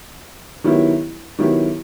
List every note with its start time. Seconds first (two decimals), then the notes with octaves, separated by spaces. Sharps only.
0.64 D#3 F#3 B3 E4 G4
1.38 D#3 F#3 B3 E4 G4